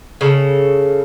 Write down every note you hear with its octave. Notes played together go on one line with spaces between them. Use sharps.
C#3 A4